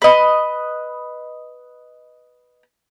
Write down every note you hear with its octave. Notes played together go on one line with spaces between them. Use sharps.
B4 D#5